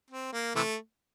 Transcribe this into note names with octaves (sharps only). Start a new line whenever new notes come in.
C4
A#3
C3 E3 A3